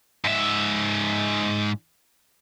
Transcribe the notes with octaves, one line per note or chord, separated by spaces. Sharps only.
G#2 E5